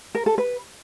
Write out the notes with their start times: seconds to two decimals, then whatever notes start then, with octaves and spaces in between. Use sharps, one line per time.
0.15 A#4
0.26 A4
0.38 B4